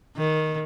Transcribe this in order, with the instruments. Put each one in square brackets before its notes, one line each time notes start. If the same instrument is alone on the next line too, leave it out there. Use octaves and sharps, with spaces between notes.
[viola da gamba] D#3